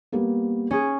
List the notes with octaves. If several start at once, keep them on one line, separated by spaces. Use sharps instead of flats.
G3 A#3 B3
C#4 G#4